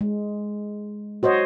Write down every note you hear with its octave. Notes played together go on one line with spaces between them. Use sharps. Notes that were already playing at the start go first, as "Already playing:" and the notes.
G#3
F#4 C5 C#5 D#5